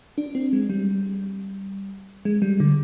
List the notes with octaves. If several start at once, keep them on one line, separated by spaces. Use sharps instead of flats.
D4
C4
G#3
G3
G#3
G3
D3